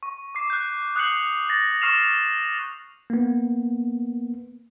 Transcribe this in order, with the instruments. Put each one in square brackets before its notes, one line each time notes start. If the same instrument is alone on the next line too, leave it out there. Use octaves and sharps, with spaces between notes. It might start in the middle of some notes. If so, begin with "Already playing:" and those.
[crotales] C#6
D6 C7
F#6 G6
D#6 F#6 G6 C7 C#7 F#7
A6 A#6
C#6 F6 C7 E7 F7
[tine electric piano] A#3 B3